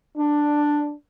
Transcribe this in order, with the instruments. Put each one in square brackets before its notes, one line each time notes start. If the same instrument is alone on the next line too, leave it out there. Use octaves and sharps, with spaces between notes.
[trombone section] D4